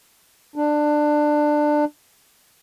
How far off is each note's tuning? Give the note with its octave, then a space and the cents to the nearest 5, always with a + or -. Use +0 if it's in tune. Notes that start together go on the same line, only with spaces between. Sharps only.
D4 +15